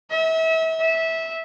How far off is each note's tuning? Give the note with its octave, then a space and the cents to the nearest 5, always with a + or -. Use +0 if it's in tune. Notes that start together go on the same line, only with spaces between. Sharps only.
E5 -35
E5 -15